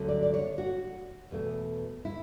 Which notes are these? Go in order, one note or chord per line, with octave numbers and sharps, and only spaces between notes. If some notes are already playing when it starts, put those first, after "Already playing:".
Already playing: D2 D3 F#3 A3 C#4
D5
D5
C#5
F#4
E2 B2 A3
E4